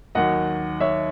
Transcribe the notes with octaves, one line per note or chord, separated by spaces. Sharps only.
D#2 D#3 F#3 D#5 F#5
C#5 E5